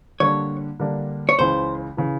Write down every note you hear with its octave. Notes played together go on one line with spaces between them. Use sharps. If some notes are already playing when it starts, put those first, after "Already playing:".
D3 G3 A#3 D4 C#5
D3 G3 A#3 D4
C#5
C#2 C#3 E3 C5
C#3 E3